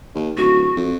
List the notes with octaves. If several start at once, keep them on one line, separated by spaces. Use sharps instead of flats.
D#2
D1 F#4
F2